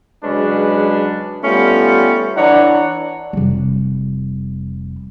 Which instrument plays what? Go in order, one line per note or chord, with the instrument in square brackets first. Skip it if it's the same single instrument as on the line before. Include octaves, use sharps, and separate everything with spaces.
[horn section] C#3 F#3 G#3 C#4 D4 B4
G3 A3 B3 C#4 F4
E3 D4 E4 C#5 F#5 A#5
[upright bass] F1 G3